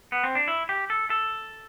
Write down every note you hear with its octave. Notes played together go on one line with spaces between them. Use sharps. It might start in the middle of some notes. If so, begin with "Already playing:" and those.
B3
C4
D4
E4
G4
A4
A4